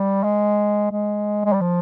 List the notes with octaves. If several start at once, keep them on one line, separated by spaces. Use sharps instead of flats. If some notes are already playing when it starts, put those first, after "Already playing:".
Already playing: G3
G#3
G#3
G#3
G3
F3